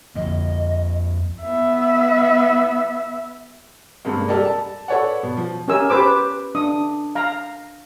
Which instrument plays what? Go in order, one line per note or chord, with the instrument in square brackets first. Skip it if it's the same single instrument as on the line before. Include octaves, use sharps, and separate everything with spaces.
[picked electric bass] F2 F3 A#3 [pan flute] D#5
[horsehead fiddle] B3 E5
[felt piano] G2 C3 G#3 A#3
G3 G4 A4 A#4 D5 D#5
A5
A4 B4 C#5 D5 F#5
B2
F3
[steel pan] C#4 G4 A#4 G#5 E6
G4 B4 C5 D6 E6
D4 D#6
F5 A#5